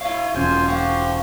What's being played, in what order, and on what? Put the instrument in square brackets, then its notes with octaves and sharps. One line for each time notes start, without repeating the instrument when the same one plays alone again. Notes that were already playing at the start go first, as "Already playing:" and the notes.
[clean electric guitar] E4 F5 [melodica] C#5
[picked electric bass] E1 C#4 [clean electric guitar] D#2 F#3 [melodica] F4 C5 G#5
[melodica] F#4 G4 [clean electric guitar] C5 F5